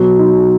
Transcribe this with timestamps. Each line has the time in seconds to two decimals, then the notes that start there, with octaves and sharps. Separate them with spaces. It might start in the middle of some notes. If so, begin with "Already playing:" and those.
Already playing: B2 F#3
0.19 D#4